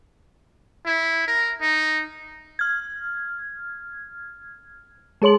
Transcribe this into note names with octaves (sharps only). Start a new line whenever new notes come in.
E4
A#4
D#4
F6 G#6
G#3 G#4 C#5 C6 F#7